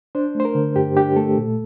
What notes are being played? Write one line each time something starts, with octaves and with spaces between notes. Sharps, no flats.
D4 C5
A3 C5
A#4
D3
G2 G4
D4 G4
A3 A4
A#2